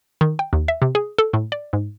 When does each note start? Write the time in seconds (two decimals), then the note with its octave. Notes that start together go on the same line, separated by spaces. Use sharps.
0.21 D#3
0.39 G5
0.53 D#2
0.68 E5
0.82 C3
0.95 G#4
1.18 A4
1.33 A2
1.52 D5
1.73 G#2